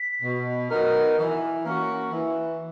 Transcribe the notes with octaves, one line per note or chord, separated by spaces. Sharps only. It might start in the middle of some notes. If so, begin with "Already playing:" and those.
Already playing: B6
B2
F#3 B3 D#4 A#4
E3
A#3 C#4 F#4
E3